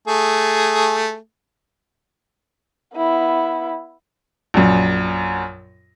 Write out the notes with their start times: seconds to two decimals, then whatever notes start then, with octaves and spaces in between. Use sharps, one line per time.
0.08 A3 G#4
2.96 B3 E4
4.54 A#1 F#2